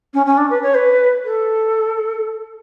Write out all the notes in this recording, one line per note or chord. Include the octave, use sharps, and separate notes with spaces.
C#4
C#4
D4
B4
C#5
B4
A4